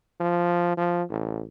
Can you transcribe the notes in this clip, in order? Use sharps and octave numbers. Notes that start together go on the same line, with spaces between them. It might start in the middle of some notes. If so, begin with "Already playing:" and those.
F3
F3
A1